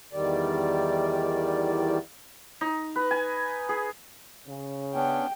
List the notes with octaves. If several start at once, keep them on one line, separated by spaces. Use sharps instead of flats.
E2 D#3 G3 D5
D#4
B4
G#5
G#4
C#3
B3 C#4 D4 G5